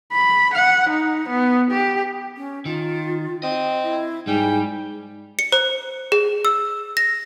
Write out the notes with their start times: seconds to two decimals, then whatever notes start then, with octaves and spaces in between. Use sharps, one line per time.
0.12 B5
0.54 F#5
0.89 D#4
1.29 B3
1.71 G4
2.37 C#4
2.66 D#3 F4
3.43 C4 D#5
3.84 E4
4.27 G#2 G3 G5 G#5
5.39 C#7
5.52 C5
6.12 G#4
6.45 E6
6.97 A#6